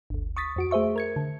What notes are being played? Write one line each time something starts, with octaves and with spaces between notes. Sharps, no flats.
G1 D2
C#6 D#6 A6 B6
F2 F#4 D7
A3 G#4 C5 E5 C#6
A#4 G#6 C#7
D3